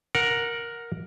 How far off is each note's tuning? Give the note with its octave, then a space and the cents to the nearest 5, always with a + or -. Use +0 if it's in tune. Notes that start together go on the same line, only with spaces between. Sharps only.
A#4 +5 F#5 -15